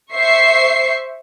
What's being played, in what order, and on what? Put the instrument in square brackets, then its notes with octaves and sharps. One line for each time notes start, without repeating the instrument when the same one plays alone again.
[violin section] C5 E5 C#6 C7